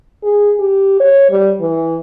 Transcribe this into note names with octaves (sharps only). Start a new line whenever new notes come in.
G#4
G4
C#5
G3
E3